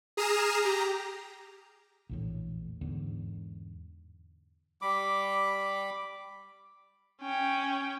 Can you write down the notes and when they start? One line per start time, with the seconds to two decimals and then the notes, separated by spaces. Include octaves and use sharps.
0.17 G#4 A#5 D#6 F6 C7 E7
0.62 G4 A#5
2.09 A#1 E2 A2
2.81 E2 G#2 D3
4.82 G3 B5 D6
7.22 C#4 G5